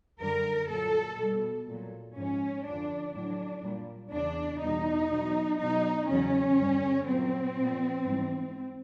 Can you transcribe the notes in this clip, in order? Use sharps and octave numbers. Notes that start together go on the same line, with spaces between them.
F#2 D3 G3 A#4
A#2 F#3 A4
B2 G3
A#2 F#3
G#2 F3 C#4
F2 D3 F3 D4
A2 F#3 D4
A#2 G3
E2 C#3 E3 D4
E2 B2 G3 D#4
B2 F#3
B2 F#3 D#4
E2 C#3 F#3 C#4
G2 D3 G3
A#2 F#3 C4
A#2 F3
G#2 E3 G3